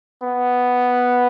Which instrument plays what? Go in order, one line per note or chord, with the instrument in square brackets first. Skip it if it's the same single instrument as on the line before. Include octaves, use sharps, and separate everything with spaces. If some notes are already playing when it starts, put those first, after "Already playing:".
[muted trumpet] B3